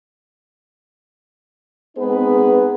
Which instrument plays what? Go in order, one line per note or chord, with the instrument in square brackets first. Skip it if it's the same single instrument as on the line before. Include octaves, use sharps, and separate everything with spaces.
[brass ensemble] G#3 B3 C4 D#4 G#4 B4